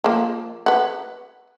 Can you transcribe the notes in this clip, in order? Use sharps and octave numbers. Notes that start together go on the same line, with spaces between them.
F3 A#3
B4 F#5